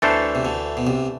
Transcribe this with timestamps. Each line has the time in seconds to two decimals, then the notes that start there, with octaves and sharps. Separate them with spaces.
0.02 D2 D3 E3 A3 D4 A4 C5
0.35 C3
0.45 D2 D3
0.77 B2
0.87 C2 C3